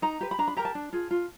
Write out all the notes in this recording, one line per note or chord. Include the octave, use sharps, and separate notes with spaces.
D#4 A#5
G4 B4
B5
D4 A#5
B5
G4 A#4 A#5
A5
D4
F4 G#4
F4